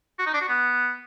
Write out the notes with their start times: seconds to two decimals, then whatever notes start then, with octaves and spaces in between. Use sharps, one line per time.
0.19 F#4
0.26 D#4
0.34 D4
0.41 F#4
0.48 B3